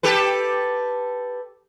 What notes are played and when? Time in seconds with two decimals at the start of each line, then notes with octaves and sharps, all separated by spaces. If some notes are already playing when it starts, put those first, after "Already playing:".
0.03 G4 A4 B4